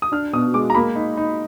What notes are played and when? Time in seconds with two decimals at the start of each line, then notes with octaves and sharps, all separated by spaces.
0.02 D#6
0.12 D4 F6
0.33 B2 D#6
0.54 G#3 D6
0.70 A#5
0.75 A#3 B5
0.96 D#4
1.17 D#4